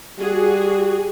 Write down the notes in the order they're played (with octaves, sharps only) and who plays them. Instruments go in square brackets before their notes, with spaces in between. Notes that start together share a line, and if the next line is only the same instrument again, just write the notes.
[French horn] G3 [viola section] F#4 G#4